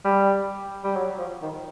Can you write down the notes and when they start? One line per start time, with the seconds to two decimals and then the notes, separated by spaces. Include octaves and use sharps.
0.05 G3
0.83 G3
0.96 F#3
1.18 F3
1.42 D#3